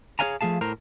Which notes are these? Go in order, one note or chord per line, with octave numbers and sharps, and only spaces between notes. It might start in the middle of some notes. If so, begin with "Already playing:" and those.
G#4 C5 C#5 F5 G#5 A#5
F3 A3 G#4 F5 A5
A2 A#4 C5 A#5